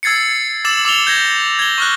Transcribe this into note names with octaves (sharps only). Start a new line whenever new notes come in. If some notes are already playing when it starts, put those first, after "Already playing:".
E6 G#6 A6 C7 C#7
D6 E6 A6 E7 F#7
D6 E6 F7 G7
G6 G#6 A#6
G#6 G7
C#6 F6 F#6